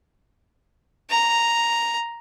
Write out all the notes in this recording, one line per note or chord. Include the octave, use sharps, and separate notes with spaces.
A#5